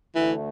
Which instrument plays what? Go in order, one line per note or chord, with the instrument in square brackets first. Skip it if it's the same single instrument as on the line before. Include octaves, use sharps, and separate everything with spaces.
[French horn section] D2 D3 A3 [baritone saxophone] E3